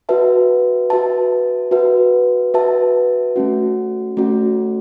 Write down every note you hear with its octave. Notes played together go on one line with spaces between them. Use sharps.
F#4 B4 E5 A5
F#4 B4 E5 A5
F#4 B4 E5 A5
F#4 B4 E5 A5
A3 C#4 F#4
A3 C#4 F#4